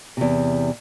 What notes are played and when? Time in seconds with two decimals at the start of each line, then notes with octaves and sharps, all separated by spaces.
0.17 E2 C3